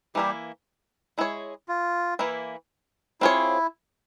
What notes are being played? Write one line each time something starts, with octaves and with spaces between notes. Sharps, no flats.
E3 G3 A#3 E4 G4
G#3 E4 G#4 C#5
F4
E3 A#3 E4
C4 E4 F4 G#4 C#5